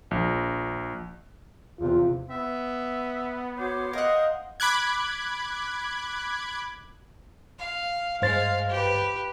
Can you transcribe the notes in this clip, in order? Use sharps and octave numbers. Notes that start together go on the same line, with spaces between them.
A#1
E2 C3 F4
B3 E5
F#4 C5 C#5 D6
A#4 D#5 F5 F#5 D#6
B5 D6 F#6 G#6
F5
G2 G#3 C5 F5 A6
G4 B4